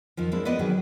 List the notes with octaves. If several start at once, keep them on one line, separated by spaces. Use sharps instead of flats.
F2 D#3 F3
G#3 A#3 C4 D4 E4
B3 B4 D5 D#5
D#3 F#3 F#4 G#4